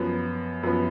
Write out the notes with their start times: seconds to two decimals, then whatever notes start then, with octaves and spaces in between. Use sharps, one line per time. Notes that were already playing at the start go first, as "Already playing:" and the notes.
Already playing: F#2 F3 B3
0.63 F#2 F3 B3